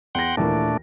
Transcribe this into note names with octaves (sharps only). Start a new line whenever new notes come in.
E2 F#5 G5 C6 A#6
D#2 A#2 E3 A3 D4 A#4